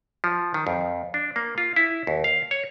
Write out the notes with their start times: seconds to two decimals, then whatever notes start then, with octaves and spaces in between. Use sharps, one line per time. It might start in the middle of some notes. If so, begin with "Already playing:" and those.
0.24 F3
0.54 D#3
0.67 F2
1.14 D4
1.36 A#3
1.58 F4
1.76 E4
2.07 D#2
2.24 F5
2.51 C#5